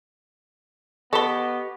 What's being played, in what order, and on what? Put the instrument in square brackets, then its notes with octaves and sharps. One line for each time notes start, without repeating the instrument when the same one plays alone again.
[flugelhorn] B3 [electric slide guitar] G4 D#5 [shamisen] A4 B4 [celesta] C#6 G7